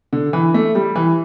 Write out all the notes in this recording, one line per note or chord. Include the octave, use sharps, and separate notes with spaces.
D3
E3
A3
G3
E3